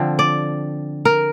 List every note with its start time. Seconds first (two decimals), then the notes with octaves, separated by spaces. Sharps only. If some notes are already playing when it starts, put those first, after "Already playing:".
Already playing: D3 F3 C4
0.19 D5
1.05 A#4